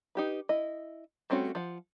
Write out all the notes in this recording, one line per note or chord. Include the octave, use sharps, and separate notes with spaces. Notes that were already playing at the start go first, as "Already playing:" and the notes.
D#4 G4 B4
E4 D#5
G3 A3 C4 C#4 F#4
F3 F#5